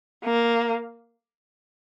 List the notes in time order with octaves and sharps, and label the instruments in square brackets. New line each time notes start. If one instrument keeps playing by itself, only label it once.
[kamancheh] A#3